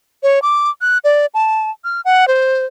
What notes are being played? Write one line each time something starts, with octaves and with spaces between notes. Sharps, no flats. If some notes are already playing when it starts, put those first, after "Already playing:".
C#5
D6
F#6
D5
A5
F6
F#5
C5